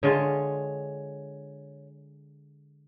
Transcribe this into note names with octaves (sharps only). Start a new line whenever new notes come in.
D3 G#3 F4 C#5